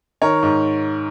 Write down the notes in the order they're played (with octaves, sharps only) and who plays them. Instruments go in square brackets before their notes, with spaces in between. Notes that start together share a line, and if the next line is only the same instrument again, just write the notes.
[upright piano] D#3 A#4 C#5
G#2